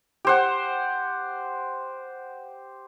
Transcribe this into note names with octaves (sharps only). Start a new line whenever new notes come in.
G4 C5 F#5